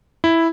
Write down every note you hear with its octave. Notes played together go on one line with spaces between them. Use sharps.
E4